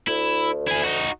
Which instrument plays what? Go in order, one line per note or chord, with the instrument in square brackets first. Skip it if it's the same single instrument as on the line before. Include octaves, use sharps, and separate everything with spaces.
[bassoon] D2 [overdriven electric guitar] E4
[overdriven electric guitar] E4 G#4
D#4 F#4